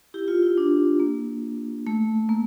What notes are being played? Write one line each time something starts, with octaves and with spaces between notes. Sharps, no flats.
E4 G4
F4
E4
D4
A#3
A3
A#3